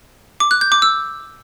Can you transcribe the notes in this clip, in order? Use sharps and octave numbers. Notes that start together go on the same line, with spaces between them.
D6
F#6
G6
D6
E6